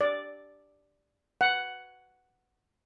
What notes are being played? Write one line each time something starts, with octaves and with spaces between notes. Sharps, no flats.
D5
F#5